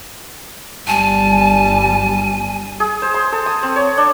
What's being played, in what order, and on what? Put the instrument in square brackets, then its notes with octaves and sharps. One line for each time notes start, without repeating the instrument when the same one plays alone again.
[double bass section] G1 G3 [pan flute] G#5 [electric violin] A5
[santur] G#4
C5
C6
A4
D#6
C4
C#5
D4